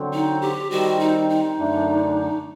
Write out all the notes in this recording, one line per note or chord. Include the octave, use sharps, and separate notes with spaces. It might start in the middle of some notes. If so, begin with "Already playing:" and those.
Already playing: D3 F#3 C4
D#4
G4
D#3 G3 C4 F#4
D#4
D#4
F#2 D3 A3 D4